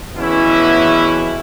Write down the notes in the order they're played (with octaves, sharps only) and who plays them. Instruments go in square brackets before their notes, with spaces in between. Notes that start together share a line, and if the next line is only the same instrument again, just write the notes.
[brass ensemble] E2 B2 E3 C#4 E4